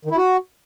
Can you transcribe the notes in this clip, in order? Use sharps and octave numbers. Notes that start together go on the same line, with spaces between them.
D#3
E4
F#4